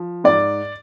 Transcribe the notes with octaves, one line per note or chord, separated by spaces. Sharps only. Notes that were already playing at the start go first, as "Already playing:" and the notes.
Already playing: F3
G#2 D5